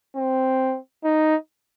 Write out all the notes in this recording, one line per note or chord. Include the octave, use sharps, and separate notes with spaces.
C4
D#4